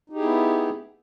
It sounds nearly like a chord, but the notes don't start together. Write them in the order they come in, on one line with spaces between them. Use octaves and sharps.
D#4 G4 G#4 E4 B3